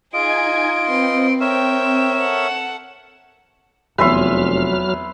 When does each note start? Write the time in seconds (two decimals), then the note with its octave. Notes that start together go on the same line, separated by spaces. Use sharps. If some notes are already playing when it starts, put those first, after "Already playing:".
0.13 D#4 F4 G#4 D#5 G#5 G#6 D7
0.86 C4 B4 C6
1.41 A#4 C#5 E5 G5 E7
2.19 A4 F#5
3.98 F1 E2 F#3 B4 E5 C6 F6